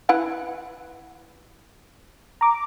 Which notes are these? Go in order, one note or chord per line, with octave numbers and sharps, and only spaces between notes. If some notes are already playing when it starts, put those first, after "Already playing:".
E4 B4 F#5
A#5 D6